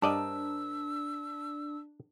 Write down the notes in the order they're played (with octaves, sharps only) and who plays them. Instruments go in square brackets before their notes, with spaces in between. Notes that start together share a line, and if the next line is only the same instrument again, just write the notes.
[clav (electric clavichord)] G2 D5 D#5 [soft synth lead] D4 [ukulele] A#4 C5 A5 [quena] E6